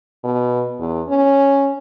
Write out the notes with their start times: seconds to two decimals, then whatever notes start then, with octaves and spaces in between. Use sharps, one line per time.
0.24 B2
0.80 E2
1.09 C#4